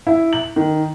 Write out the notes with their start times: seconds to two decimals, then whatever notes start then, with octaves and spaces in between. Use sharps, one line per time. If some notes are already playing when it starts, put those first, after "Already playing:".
0.07 E4
0.33 F#7
0.56 D#3